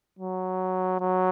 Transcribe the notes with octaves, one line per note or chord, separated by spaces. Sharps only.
F#3
F#3